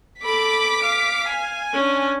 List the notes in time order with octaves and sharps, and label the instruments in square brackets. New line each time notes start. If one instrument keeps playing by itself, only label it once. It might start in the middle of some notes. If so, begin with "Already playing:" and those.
[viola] A4 B5 [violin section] D6 B6
[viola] F5
[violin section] G#5
[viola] C#4 D4